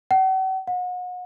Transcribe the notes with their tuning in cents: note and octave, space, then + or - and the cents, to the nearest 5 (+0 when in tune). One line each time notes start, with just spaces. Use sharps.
F#5 +45
F#5 -35